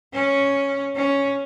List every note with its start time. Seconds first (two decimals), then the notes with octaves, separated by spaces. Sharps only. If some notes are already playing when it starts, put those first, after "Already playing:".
0.13 C#4
0.95 C#4